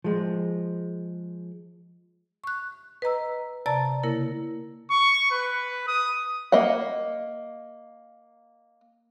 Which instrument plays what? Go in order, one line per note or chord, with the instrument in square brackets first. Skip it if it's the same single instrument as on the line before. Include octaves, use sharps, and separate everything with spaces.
[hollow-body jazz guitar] F3 G#3
[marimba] C#6 F#6
B4 D#5 A#5 E6
C3 D5 A5 A#5 A6
C#3 A#3 E4 A#4
[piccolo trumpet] C#6
B4
D#6
[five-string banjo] A#3 D#5 E5 F#5